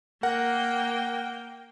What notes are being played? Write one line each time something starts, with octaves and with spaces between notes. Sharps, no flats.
A#3 A#4 F#5 G5